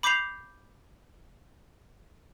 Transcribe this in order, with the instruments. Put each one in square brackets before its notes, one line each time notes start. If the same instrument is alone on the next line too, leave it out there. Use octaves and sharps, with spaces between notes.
[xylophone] B5 D6 G6 B6 C7 F7